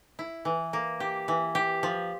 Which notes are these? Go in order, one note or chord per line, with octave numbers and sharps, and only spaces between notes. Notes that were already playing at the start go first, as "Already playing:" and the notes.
E4
E3
A#3
G4
E3
G4
F3